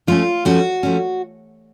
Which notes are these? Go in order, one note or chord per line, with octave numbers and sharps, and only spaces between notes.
F3 A3 C#4 F4
F3 A3 C#4 F#4
F3 A3 C#4